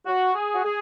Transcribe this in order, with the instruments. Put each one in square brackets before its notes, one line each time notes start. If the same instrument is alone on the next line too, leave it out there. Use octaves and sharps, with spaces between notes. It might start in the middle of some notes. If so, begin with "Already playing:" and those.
[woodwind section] F#4
G#4
F#4
G#4